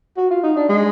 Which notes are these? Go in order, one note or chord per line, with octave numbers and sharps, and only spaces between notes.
F#4
F4
D#4
D4
G#3